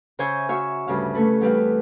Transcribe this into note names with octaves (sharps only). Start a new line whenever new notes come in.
C#3 C5 C#5 E5 G#5 G6
F#4 C#5 E5 F5 C#6
D2 G2 C#3 F5
A3 C#4 A4 B4
E2 G3 C4 G4 B4 F5